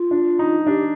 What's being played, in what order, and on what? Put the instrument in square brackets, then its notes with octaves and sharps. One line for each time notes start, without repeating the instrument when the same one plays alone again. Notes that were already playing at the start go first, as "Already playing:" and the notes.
Already playing: [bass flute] F4
[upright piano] D4
D#4
[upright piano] D4 [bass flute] G4